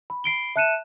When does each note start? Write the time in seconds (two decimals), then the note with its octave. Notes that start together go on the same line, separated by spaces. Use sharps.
0.10 B5
0.24 B5 C7 D7 G7
0.56 E5 A5 F#6 C#7 D#7 E7